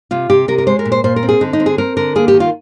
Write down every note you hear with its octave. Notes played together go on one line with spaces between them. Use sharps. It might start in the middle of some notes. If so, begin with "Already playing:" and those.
C3 F4
C3 G4
C3 A#4
A#4
G#3 C5
A#4
A#2
C5
A#2 C5
A#4
C4
G#4
D3 D#4
D#4
C4
G#4
C4 A#4
D3 A#4
A#3 G#4
G4
D#3
F4